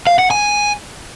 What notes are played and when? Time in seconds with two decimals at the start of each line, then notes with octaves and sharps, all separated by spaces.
0.07 F5
0.19 F#5
0.31 G#5